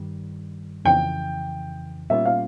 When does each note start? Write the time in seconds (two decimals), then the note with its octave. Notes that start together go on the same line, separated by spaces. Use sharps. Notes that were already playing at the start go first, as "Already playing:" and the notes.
Already playing: G2 D#3 G3
0.85 F2 C#3 E3 G5
2.10 A#2 G3 A#3 C#4 F4 E5
2.26 F5